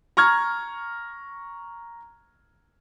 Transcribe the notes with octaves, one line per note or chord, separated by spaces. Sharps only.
A#5 C#6 F6 G#6